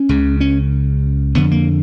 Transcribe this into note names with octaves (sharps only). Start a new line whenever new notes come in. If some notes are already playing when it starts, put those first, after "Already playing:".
Already playing: C#4
C#2 C#3
C#4
F2 D3 B3
A#3